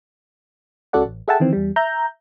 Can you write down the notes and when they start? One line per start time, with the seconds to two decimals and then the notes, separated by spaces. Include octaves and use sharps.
0.93 C#2 C#3 F#4 A4 D5 F#5
1.05 A1
1.28 G#4 A4 E5 F#5 G5 A5
1.40 D#3 E3 C4
1.53 E2 G3
1.76 E5 A#5 G6